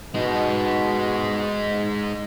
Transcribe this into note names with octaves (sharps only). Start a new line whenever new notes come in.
B2 G#3 D#4